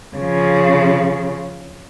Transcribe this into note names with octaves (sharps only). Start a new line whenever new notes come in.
C#3 F3